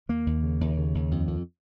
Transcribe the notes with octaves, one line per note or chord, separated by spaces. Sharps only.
D#2 A#3
D#2
C#3
D#2
C#3
D#2
F2
F2